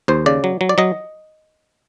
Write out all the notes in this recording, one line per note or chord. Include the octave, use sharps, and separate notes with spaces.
D#2 C5
C#3 D5
F#3
F#3
D5
F#3 D#5